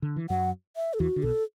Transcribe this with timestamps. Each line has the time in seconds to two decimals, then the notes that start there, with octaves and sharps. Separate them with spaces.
0.02 D3
0.16 E3
0.29 F#2 F#3 F#5
0.76 E5
0.94 A4
0.99 E2 E3 F#4
1.16 D3
1.23 B1 B2 A4